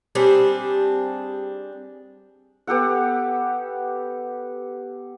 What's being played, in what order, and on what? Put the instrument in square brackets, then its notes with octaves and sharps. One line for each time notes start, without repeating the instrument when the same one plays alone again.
[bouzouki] G3 C4 D4 G#4
[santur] B3 G4 A4 F#5